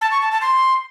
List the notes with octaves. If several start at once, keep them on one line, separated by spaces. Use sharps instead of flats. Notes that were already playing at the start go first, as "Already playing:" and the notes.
A5
C#6
A5
A5
C6